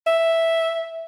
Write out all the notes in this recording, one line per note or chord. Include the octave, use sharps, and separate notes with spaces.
E5